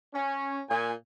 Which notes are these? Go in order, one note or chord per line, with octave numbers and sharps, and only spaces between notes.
C#4
A#2 G#5